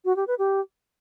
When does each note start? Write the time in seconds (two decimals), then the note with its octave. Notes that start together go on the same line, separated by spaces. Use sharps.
0.05 F#4
0.16 G4
0.27 B4
0.39 G4